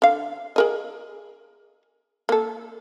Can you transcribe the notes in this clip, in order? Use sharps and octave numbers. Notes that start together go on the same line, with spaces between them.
D3 F5
G#4 A#4 D#5
A#3 A4